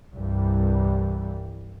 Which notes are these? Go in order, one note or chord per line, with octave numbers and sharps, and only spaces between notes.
C2 G2 E3 G3